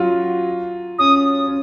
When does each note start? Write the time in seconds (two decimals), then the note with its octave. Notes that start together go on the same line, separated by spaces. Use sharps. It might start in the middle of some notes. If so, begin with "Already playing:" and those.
Already playing: F#3 F4 F#4
0.99 C#4 D#6
1.47 C#4